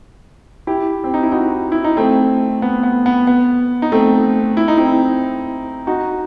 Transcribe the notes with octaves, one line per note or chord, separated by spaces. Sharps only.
E4 G4
C4
D#4
E4
D#4 F#4
E4
D#4
A3 C4
B3
B3
B3
B3
D#4
A3 C4
E4
D#4
C4 E4
D#4 F#4